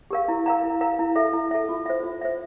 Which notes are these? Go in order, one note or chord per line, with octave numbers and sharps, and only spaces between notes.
G4 A#4 F5
E4
A#4 F5 A#5
E4
A#4 F5 A#5
E4
A4 E5
E4
A4 E5
F4
C5 E5
F4
C5 E5